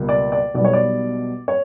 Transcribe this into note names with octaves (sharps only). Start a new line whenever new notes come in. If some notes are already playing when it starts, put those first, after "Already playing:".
Already playing: C#2 B2 G3 A#3
D5
D5
B1 B2 G3 B3 D5
C#5
D5
C#5